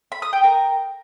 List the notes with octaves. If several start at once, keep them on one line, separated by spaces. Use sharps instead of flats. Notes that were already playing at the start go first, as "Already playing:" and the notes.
B5
D#6
G5
A#4